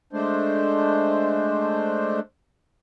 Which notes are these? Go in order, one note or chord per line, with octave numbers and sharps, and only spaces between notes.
G#3 A3 D4 C5